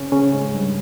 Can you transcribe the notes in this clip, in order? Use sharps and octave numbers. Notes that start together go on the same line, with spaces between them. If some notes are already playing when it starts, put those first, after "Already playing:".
Already playing: C#3 C4 C#4
C#3 C#4
G#2 G#3
G2 G3